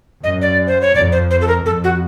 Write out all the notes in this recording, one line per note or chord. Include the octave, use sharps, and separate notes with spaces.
F#2 D#5
D5
C5
C#5
F2 D5
C5
C5
A4
A#4
F2 A4
F#4